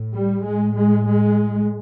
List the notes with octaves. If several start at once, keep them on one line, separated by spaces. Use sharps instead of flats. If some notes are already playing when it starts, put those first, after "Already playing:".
Already playing: A2
G3
A2 G#3
G#3
G#3